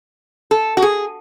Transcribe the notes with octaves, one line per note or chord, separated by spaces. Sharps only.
A4
F#4
G#4